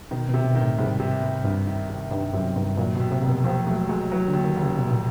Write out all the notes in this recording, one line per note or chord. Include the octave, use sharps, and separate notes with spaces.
B2 D#3
B2
C3
B2
D#3
A2
C2 G#2
C3
C2
C2 G2
D#3
C3
G2 D#3
F#2 C3
G2 D#3
A#2 F#3
D#2 B2
C3
F1
B2
D#2 F3
F#3 A3
F#3 G#3
E3 F#3
D3
D#2
D#3
F1
C#3
F1 B2
A#2